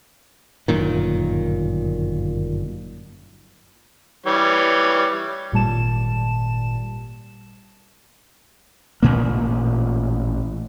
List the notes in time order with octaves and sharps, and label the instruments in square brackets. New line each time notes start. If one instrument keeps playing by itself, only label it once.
[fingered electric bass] G1 F#2 A#2 D#3
[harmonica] E3 G3 C#5
[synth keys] G#1 A#2 G3 A5 E7
[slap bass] A1 A#2 A#3